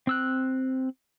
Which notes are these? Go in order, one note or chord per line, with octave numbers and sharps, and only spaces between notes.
C4 E6 F#6